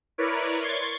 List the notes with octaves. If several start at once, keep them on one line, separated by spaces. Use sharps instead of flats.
E4 A#4 B4 C#5 D5
C6 C#6 G#6 A6